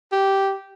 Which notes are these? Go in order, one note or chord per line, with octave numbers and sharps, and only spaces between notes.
G4